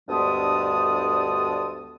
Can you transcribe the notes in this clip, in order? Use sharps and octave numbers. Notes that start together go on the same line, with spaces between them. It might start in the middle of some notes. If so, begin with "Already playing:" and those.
D2 G2 G#3 B3 A5 D#6